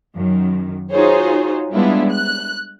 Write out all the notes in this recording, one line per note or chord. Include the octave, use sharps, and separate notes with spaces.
F#2 D#3
D#4 F4 F#4 G#4 C5 C#5
G3 G#3 B3 D4 E4 F4
F#6